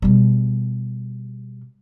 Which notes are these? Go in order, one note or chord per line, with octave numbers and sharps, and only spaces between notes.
B2 G3